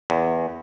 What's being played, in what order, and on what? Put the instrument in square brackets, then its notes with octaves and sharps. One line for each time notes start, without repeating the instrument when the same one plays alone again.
[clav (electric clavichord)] E2